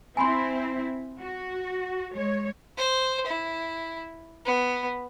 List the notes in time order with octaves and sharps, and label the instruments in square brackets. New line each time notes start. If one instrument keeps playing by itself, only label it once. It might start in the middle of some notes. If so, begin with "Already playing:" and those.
[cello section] C4 E4 [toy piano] G#5 B5 C6
[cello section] F#4
G#3 C#5
[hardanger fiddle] C5
E4
B3